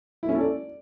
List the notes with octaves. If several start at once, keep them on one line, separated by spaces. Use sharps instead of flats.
E4
C#4
A4
D5